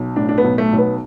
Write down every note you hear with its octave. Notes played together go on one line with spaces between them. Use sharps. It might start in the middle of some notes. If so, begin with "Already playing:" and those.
Already playing: B1
A2 D4
D4
B3
B1
A3
B1
B3